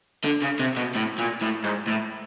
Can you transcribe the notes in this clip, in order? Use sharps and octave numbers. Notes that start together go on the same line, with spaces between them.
D3
C#3
C3
B2
A2
A#2
A2
G#2
A2